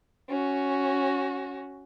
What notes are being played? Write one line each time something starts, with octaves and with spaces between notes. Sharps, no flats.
C#4 F#4